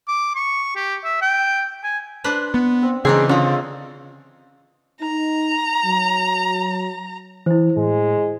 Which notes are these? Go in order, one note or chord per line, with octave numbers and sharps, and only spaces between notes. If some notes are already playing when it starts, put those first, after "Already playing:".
D6
C#6
G4
E5
G5
G#5
D4 B4 C5
B3
C4
C#3 E3 C4 D4 D#4 G#4
D3 C4 C#4 F4 D#5
D#4 A#5
F#3
E3 E4 C5
A2 G#3